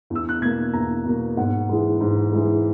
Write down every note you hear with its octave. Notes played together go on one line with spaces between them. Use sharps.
E2
E6
F#6
B2 A#3 G#6
E2 A#5
B2 A#3
G#2 F#5
E3 G#3
G#2
E3 G#3